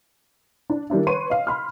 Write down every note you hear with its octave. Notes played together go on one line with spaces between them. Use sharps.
D4
D#3 G3 D4 E4
B4 C#5 C6 C#6 D#7
D#5 F5
B5 C6 F6